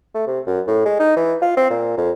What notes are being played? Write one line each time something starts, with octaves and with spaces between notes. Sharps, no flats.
A3
C3
F#2
A2
G#3
D#4
E3
F4
C4
A#2
F2